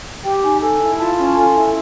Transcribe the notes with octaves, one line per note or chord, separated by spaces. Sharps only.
G4 G5
D#4 G#5
A4 G#5
E4
F4 A5
C#4
A4 G#5
E4